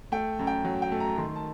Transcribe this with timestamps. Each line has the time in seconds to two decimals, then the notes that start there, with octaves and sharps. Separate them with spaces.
0.12 A3 G5
0.39 F#2
0.47 G5
0.65 F#3
0.82 G5
0.92 A3
1.00 A#5
1.18 D#3 C6
1.36 A5